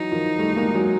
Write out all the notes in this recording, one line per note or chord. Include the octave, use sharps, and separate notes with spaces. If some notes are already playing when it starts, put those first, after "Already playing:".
Already playing: E3 F#3 D#4
D#3 F3
G3 A3
G#3 A#3
F#3 G#3